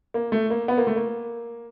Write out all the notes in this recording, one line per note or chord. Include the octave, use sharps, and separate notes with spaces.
A#3
A3
A#3
B3
A#3
A3
A#3